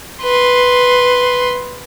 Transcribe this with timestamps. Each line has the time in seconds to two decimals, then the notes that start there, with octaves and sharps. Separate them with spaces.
0.23 B4 C6